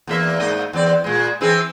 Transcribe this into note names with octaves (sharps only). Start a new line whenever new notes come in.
E2 A#3 E5
G#2 A#3 D#5
E2 C4 D5
A#2 G#3
E3 C4 G#4